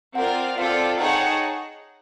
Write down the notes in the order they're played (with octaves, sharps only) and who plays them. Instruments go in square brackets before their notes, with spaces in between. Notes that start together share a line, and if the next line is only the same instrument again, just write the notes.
[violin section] C4 F4 A#4 D5 F5 [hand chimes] F#5
[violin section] C4 F4 A4 D5 [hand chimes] F5
[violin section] D#4 G#4 C#5 F#5 A5 [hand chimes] G5